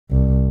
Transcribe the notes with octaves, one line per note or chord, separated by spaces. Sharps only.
C2